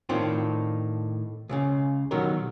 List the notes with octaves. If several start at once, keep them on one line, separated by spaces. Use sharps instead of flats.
A2 D#3 C4 D4 F4
C#2 A2 C#3
B2 D3 D#3 F#3 G4 A#4